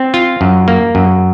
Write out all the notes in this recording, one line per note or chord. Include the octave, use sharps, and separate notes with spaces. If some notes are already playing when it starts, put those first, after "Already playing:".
Already playing: C4
F4
F#2
A#3
F#2